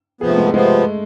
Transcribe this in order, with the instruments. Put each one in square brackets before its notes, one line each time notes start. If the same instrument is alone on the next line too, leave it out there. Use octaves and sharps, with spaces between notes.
[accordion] C3 F3 B3 [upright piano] G#4
[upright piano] A3
G#3
A3
[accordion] C3 F3 B3 [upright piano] G#3